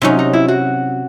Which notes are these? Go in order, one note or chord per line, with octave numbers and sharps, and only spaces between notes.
C3 F#3 C#4 D#4
D#4
E4
F#4